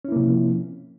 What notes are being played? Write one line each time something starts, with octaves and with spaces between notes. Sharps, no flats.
C3 F3 A#3 C#4 E4